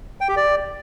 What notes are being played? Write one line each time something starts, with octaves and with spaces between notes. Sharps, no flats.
G5
G4
D5